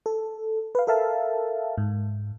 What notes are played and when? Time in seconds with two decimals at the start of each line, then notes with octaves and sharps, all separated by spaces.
0.06 A4
0.75 B4 F5
0.87 A4 A#4 E5 F5 A5
1.78 G#2